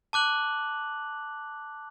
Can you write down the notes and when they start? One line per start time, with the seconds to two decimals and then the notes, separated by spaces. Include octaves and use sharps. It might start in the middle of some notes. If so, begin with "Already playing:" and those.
0.13 A5 D6 F#6 F#7